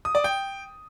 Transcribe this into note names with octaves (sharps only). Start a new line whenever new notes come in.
D#6
D5
G5